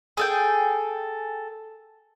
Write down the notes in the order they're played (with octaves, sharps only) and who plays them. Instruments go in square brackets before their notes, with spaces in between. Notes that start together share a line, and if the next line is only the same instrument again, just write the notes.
[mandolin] G#4 A4 G5